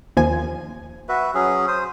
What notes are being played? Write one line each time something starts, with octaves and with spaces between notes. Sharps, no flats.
D#2 F3 G#5
F#4 B4 E5
F#3 C#4 G#4
C5 D#6